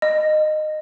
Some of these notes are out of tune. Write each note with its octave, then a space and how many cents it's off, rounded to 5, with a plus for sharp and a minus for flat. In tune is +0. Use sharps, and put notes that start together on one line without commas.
D#5 -15